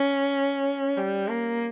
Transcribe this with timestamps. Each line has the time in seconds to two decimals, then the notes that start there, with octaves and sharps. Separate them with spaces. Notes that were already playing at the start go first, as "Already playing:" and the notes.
Already playing: C#4
0.97 G3
1.28 A#3